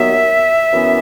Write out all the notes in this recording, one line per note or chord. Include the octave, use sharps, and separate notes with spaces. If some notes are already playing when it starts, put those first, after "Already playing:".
Already playing: D#2 D#3 F#3 B3 E5
F#2 E3 B3